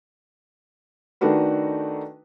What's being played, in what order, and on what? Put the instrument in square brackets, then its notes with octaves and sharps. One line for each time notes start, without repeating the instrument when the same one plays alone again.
[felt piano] D#3 A3 D4 D#4 F#4 B4